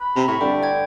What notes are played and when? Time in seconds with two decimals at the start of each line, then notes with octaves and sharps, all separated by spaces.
0.01 B5
0.16 C3 A#5
0.28 A2 E5 C#6
0.41 G2 D3 G5
0.63 G5 G#6